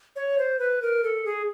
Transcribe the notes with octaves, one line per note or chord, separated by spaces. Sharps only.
C#5
C5
B4
A#4
A4
G#4